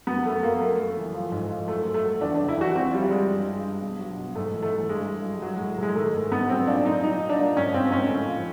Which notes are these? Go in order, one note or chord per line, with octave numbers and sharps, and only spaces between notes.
F#2 B3
F#2 A3
F#2 A#3
F#2 A3
F#2
E3
F3
G#2
F3
F#2 A3
F#2
A3
F#3
E2 D4
D4
C#3
E4
E2 F#4
F3 C4
F3 G3
G3
F3 G#3
G2
G2
G2
B2
F#3
B2
G#2 A3
E3
A3
E3
G2 G#3
G2
F#3
F#3
A2 G#3
A2 G#3
D#3 A3
G#2
G#2 B3
F#3 C4
A#2 D4
A#2 D#4
F#3 D#4
F#3
D4
A#2
G#2 C#4
G#2 C4
G#2 C#4
A2
F3